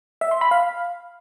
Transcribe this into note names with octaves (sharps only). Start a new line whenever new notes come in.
E5
C6
B5
F5